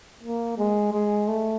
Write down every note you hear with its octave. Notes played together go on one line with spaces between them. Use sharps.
A#3
G#3
G#3
A3